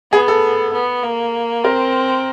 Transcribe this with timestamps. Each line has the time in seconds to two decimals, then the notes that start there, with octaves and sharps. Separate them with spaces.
0.12 B3 G#4
0.28 A4
0.73 B3
1.04 A#3
1.64 C4 A#4